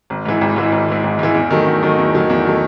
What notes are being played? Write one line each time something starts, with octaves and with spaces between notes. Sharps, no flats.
G#1
G#2 E3
G#1
G#2 E3
G#1
G#2 E3
G#1
G#2 E3
E2
D#3 F#3 A3
E2
D#3 F#3 A3
E2
D#3 F#3 A3
E2
D#3 F#3 A3